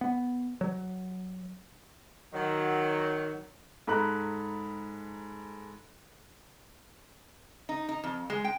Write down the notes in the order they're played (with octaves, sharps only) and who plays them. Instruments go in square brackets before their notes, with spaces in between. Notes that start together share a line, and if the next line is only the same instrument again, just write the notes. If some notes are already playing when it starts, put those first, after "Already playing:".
[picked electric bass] B3
F#3
[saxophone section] D#3 F#3
[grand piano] G#2 A4 A#5 B5 F#6
[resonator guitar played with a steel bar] D#4
D#4
F2
G#3
G5